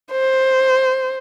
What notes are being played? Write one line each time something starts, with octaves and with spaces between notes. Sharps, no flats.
C5